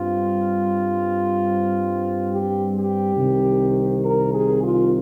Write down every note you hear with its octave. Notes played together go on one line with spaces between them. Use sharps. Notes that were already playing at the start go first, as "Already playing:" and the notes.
Already playing: G2 G3 C4 F4
G4
G4
C2 C3 D#3
A#4
G#4
F4